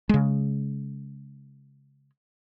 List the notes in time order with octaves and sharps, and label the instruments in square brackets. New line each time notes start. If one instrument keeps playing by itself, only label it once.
[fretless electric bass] C#3 G#3